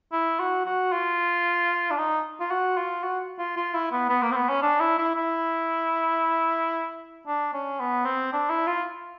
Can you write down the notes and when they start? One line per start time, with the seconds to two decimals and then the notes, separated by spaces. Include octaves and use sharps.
0.12 E4
0.40 F#4
0.66 F#4
0.92 F4
1.91 D4
1.98 D#4
2.40 F4
2.51 F#4
2.77 F4
3.03 F#4
3.38 F4
3.56 F4
3.74 E4
3.91 B3
4.09 B3
4.23 A#3
4.31 C4
4.36 B3
4.49 C#4
4.62 D4
4.80 E4
4.98 E4
5.15 E4
7.27 D4
7.53 C#4
7.80 B3
8.05 C4
8.33 D4
8.50 E4
8.67 F4